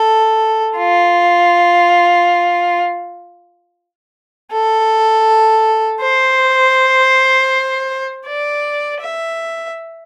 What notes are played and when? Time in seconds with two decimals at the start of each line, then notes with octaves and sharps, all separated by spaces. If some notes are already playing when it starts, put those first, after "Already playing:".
Already playing: A4
0.78 F4
4.52 A4
6.02 C5
8.27 D5
9.01 E5